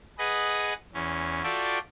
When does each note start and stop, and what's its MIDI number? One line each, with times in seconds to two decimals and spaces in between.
0.18 0.73 68
0.18 0.73 71
0.18 0.73 75
0.18 0.73 78
0.94 1.42 40
0.94 1.42 61
1.44 1.79 65
1.44 1.79 66
1.44 1.79 69
1.44 1.79 74
1.44 1.79 76
1.44 1.79 79